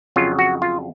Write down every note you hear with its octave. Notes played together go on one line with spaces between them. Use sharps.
F2 C#3 F#3 F4
F#4
F4